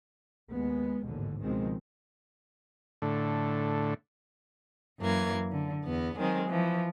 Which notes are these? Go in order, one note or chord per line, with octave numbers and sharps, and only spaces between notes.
D#2 G#3 B3
A1 D#2 G#2 B2 D3
C#2 B2 D#3 F3 G#3 C4
A2 D3
F#2 E3 A#3 G#6
D3
E2 B3
D#3 F#3 G#3 C4
E3 F3